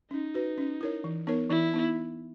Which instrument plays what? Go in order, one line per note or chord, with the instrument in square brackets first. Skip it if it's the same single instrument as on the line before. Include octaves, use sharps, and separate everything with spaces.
[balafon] C#4 [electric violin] D#4
[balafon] F#4 B4
C#4
E4 A#4 C#5
E3
B3 D#4 A#4 C#5
[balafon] E3 [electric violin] E4
[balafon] B3 D#4